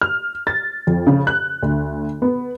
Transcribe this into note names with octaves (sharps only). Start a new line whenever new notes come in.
F6
A6
F2
C#3
F#6
D2
B3